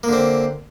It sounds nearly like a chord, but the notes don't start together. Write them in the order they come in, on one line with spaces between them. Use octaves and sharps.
A#3 D3 C4